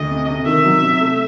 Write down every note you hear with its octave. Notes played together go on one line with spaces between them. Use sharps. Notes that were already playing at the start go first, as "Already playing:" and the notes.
Already playing: D2 D#5
C3
C3
D#3 E5
F#3
C3
A3